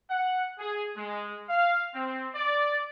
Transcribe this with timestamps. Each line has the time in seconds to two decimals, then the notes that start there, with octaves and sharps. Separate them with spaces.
0.10 F#5
0.59 G#4
0.97 G#3
1.49 F5
1.95 C4
2.35 D5